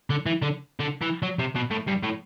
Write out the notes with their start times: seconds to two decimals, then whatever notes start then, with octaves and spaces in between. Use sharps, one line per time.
0.10 D3
0.26 E3
0.42 D3
0.80 D3
1.01 E3
1.22 F#3
1.39 C3
1.55 B2
1.70 A2
1.87 G2
2.03 A2